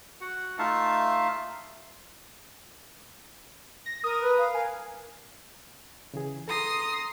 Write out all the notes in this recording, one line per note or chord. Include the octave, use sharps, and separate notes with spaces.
F#4 F#5
A3 D#4 F4 E5 F5 A5
A#6
A#4 D#6
B4
F5
A#4 G#5
C#3 E3 G#4
A4 A#5 C6 D#6